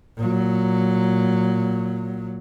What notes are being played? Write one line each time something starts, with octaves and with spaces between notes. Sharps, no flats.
A#2 F#3